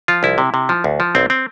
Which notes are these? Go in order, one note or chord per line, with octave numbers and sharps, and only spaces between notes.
F3 F4
C2 E4
C3
C3
F3
D2
F3
B1 C4
C4